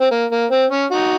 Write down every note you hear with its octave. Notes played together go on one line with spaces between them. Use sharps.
C4
A#3
A#3
C4
C#4
D#4 F#4